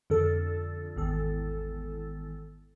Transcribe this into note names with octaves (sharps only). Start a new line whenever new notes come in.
F2 D3 A4
G#1 E2 A4